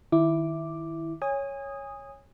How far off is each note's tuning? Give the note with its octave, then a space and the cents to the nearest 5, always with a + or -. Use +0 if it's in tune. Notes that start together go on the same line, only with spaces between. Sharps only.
D#3 +0 E4 +0 D6 +0
C#5 +0 G#5 -25 D#6 +0